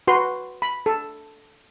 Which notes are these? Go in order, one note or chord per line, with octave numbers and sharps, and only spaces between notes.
F#4 B4 C6
B5
A4